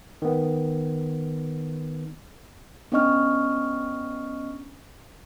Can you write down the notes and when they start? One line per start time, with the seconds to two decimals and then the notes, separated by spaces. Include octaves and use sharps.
0.22 D#3 B3
2.92 B3 C#4 D4 D#5 C#6 F6